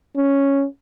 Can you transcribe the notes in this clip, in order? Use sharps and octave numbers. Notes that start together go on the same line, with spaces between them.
C#4